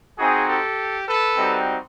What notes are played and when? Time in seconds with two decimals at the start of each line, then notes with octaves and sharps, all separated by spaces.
0.18 C4 D#4 F#4 G#4
0.48 G4 A4
1.06 A4 B4
1.36 G3 C4 D#4 F#4